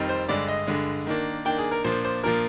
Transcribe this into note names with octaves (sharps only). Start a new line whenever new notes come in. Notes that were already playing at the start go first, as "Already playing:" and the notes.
Already playing: F2 D#3 G3 C4 D#4
C5
G2 D3 G#3 D5
D#5
G2 D3 G#3
D#3 A#3 D4
D#3 A#3 D4 G5
G#4
A#4
A#2 F3 A#3 D4 C5
C5
A#2 F3 A#3 D4 A#4